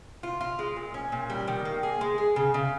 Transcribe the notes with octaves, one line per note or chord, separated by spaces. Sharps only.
F4
F4
G#3
A#2
C#4
A#2
G3
D#3
A#3
G#4
G#3
G#4
C#3
C#3